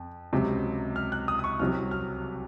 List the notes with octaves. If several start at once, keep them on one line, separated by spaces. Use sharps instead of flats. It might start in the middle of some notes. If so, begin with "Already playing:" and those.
Already playing: F2
C#2 C3 F#3
F6
F#6
D#6
D#6
C#6
C2 C3 F#3 F6
F6